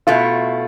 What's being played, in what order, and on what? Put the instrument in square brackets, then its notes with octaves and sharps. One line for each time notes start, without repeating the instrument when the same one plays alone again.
[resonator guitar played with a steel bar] B2 A3 E4 [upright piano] F4